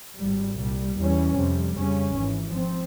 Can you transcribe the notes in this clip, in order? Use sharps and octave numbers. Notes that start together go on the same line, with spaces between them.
G#1 G#2 G3
C2 A#2 G3
E2 E3 G3 C#4
F2 C3 G3
F2 C#3 G3 C#4
G#1 G#2 E3
F3 C4